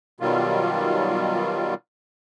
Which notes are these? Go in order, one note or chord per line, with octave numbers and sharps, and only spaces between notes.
B2 D#3 F#3 G3 F4